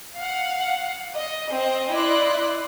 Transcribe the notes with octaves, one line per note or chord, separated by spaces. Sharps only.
F5 F#5
D#5
C4 D#5
E4 D5 D#5 C6 F#6